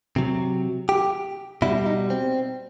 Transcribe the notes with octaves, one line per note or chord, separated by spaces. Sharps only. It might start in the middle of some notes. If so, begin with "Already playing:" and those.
C3 F#3
G4
B2 G3 E4
D#4
C4